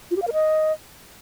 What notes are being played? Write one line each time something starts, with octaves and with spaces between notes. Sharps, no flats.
F4
G4
F5
A#4
D#5